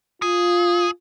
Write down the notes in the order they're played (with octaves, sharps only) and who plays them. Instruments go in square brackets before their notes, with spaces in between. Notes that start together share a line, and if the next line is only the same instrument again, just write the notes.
[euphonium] F4 [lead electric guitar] G#4